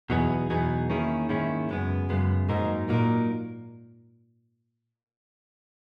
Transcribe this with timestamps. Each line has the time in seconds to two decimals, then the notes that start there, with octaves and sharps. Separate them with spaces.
0.10 E2 B2 F#3 B3 D#4 G#4
0.50 E2 B2 F#3 B3 D#4 G#4
0.90 D#3 A#3 C#4 E4 G#4
1.29 G#2 D#3 A#3 C#4 E4 G#4
1.69 F#2 C#3 G#3 B3
2.09 F#2 C#3 G#3 B3
2.49 G#2 F#3 A#3 D#4 A#4
2.89 A#2 F#3 A#3 D#4 A#4